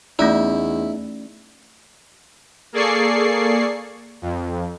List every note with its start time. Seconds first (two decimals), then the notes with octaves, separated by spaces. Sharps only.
0.19 E2 A3 C#4 D#4 E4 D5
2.73 A#3 G#4 A4 D5 C#6 C7
4.22 F2